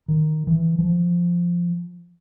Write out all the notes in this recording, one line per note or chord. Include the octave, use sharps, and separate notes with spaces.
D#3
E3
F3